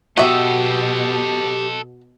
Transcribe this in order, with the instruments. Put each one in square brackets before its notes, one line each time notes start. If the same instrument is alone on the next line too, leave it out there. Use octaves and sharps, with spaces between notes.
[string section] B2 [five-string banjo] F#4 E5 [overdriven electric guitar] G4 [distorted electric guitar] A4 D#5